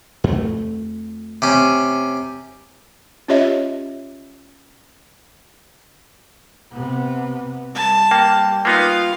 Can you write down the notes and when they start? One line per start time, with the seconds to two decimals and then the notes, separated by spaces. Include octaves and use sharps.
0.24 F2 A3
1.42 C3 C#4
3.28 C#4 F4 G4 C#5 D#5 E5
6.73 C3 B3
7.75 G3 A5
8.11 A#3 G5
8.65 A#3 B3 D#4 F4 F5